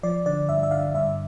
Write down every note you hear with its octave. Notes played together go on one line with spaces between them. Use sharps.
F3 D5
D3 D5
G2 E5
E5
D3 F5
G2 E5